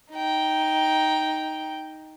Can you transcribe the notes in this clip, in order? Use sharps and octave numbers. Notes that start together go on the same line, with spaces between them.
D#4 G5